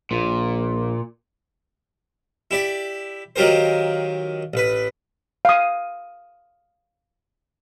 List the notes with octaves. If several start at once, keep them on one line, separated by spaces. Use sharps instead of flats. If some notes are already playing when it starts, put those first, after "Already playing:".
A#1 A#2
E4 G4 D5
D#3 F#3 F4 G4 A#4 C5
A1 B4
F5 D#6